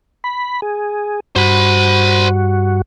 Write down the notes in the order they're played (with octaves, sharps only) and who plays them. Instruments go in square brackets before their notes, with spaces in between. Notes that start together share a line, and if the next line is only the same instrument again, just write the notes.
[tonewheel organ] B5
G#4
[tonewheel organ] G2 F#4 [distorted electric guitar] C5 B5